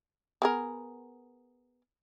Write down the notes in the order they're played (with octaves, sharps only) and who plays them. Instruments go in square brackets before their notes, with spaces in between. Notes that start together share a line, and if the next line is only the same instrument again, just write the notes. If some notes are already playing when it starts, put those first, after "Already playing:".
[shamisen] B3 G#4 A#4